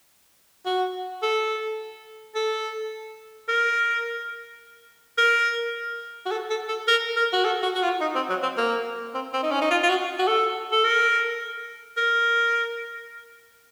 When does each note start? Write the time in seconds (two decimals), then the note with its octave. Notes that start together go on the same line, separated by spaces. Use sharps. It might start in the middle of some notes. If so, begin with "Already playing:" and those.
0.65 F#4
1.22 A4
2.35 A4
3.48 A#4
5.18 A#4
6.26 F#4
6.31 A4
6.50 A4
6.68 A4
6.88 A#4
7.16 A#4
7.33 F#4
7.45 A4
7.63 F#4
7.75 F#4
7.83 F4
8.01 D#4
8.15 C4
8.29 F#3
8.43 C4
8.57 A#3
9.14 C4
9.33 C4
9.43 D#4
9.51 C#4
9.61 D#4
9.71 F4
9.83 F4
9.89 F#4
10.19 F#4
10.27 A4
10.72 A4
10.84 A#4
11.97 A#4